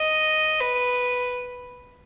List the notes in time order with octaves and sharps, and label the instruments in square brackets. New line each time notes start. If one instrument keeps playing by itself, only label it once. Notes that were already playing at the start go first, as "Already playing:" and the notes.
Already playing: [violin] D#5
B4